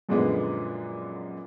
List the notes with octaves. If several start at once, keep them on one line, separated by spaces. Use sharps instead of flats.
F#2 A#2 D3 F3 G#3 B3